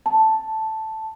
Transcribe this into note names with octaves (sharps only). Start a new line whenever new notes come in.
A5